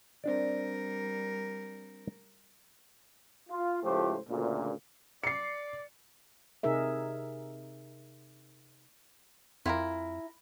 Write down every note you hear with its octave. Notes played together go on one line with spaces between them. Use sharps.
G3 C4 D4 A#4 D5
F4
C#2 A2 F3 A3 G4 C5
D2 A#2 C#3
D5 C7 C#7
C3 D#4 G#4 A#4 E5
F2 E4 F4 G4 A#4